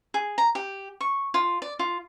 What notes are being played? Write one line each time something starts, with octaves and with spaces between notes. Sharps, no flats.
G#4
A#5
G4
C#6
F4
D5
F4